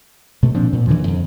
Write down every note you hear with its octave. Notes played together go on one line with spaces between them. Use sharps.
B2 A3
A#2 F3 C4 D4
A#2
D#2 D3 E3 F3
F2